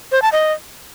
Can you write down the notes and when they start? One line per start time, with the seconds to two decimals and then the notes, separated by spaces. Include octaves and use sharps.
0.12 C5
0.22 A5
0.32 D#5